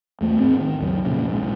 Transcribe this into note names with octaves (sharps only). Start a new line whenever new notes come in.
E2 A3
A1 G#2 C4
D#3
C#2 F#2 D#3
F2 A#2 C#3
B1 G#2